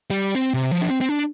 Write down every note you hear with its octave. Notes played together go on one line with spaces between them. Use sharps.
G3
C4
C3
F3
D4
C4
C4
D4